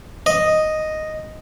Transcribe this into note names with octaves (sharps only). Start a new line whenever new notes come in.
D#5